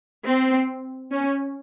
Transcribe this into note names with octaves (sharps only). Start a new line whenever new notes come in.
C4
C#4